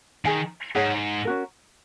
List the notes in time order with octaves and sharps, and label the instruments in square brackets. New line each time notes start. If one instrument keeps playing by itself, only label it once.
[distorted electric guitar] D#3 [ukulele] G#4 D#5 G#5
[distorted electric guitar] G#2 [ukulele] G#4 C#5 F#5 A#5
[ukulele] C#4 F#4 A#4